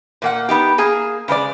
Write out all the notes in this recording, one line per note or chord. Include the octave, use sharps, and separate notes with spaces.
A#2 A#3 F#5
B3 D#4 G4
A#3 G#4
C#3 G#3 B4 D5